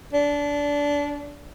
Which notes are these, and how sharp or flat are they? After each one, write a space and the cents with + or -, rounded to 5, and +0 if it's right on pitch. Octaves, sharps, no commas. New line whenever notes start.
D4 -20